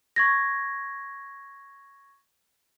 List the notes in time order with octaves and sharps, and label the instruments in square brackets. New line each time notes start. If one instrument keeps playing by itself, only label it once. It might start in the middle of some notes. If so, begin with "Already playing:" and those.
[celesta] C#6 G#6 A#6